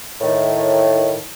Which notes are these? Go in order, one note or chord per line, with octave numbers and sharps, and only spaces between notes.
A2 D#3